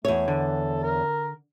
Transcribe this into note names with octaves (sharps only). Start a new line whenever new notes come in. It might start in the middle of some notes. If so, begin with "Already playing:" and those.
E2 A3 C#5
D3 A4
A#4